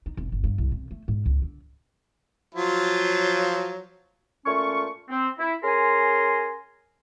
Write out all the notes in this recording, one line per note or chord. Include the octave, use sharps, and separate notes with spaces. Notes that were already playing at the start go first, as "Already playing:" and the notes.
D#4
F1
G1
G2
C2
C3
A3
G#2
C#2
D3
F3 F#3 F4
A#2 A3 C#4 F4 C#6
C4
E4
C#4 G#4 A#4 G#5 A#5 C6